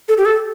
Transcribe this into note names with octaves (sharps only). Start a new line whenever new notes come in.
A4
G4
A4